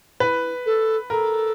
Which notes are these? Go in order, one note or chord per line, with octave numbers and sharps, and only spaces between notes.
E4 B4
A4
A4 A#4